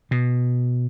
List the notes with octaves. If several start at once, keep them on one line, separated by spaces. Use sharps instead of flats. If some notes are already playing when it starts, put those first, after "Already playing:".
B2